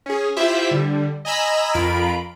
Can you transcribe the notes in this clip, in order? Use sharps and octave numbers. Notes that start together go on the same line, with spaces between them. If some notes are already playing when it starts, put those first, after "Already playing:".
C#4 G#4
E4 F4 G4 C5 E5
D3 G3
D#5 G#5 A#5 B5 E6
F2 F4 A#4 B5 D7